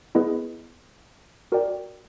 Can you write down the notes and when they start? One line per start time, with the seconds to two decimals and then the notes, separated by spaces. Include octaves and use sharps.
0.15 B3 E4 G#4 B4 D#5
1.52 F#4 A#4 D5 G5